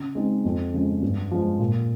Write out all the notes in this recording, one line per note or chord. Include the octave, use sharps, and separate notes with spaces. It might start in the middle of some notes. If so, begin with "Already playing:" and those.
Already playing: C#3
G#3 C4 D#4
F2
C#3 F3 G#3
G2
F3 G#3
A#2